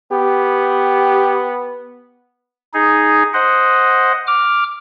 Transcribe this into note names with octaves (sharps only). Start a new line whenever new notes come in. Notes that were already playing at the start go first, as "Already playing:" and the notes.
B3 G4
D#4 G#4
C5 D#5 F#5
D6 F6